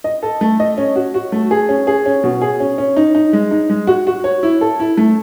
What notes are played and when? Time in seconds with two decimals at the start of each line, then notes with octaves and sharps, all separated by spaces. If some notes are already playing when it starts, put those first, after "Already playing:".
0.04 D#5
0.23 A4
0.41 A3
0.60 D#5
0.78 C#4
0.96 F#4
1.14 F#4
1.32 A3
1.51 G#4
1.69 C#4
1.87 G#4
2.06 C#4
2.24 B2
2.42 G#4
2.60 C#4
2.78 C#4
2.96 D#4
3.15 D#4
3.33 G#3
3.51 D#4
3.70 G#3
3.87 F#4
4.07 F#4
4.24 C#5
4.43 E4
4.61 A4
4.80 E4
4.97 A3